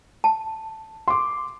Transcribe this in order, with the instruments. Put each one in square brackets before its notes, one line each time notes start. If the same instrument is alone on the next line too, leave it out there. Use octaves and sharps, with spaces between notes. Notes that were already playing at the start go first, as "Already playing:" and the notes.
[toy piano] A5
[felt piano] C6 D6